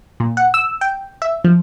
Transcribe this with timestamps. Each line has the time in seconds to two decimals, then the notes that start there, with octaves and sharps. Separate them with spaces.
0.20 A#2
0.37 F#5
0.54 E6
0.81 G5
1.22 E5
1.44 F3